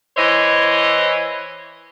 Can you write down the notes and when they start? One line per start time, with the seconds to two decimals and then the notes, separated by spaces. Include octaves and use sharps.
0.17 E3 E4 C5 C#5 D#5